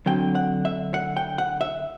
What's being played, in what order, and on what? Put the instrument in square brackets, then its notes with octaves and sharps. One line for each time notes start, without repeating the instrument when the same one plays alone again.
[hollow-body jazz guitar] D3 F#3 C4 G5
F#5
E5
F#5
G5
F#5
E5